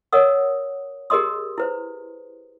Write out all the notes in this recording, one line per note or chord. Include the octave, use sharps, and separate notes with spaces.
A#4 C#5 D#5 F#5 D#6
G4 G#4 A#4 D#5 C6 D#6
E4 B4 C5